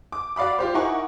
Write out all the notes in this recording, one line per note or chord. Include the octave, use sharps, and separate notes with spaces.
D6
F#4 D5 F5 B5 D6
F4 G4 C5
D#4 E4 A#4 F#5 G#5 C#6